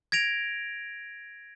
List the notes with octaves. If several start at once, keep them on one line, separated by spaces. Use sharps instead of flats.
G#6 A#6 D7 F7